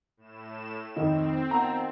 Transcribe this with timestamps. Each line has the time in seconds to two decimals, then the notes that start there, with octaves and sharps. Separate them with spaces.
0.17 A2 E7
0.96 F2 D#3 C4
1.51 D#3 F3 B3 A#5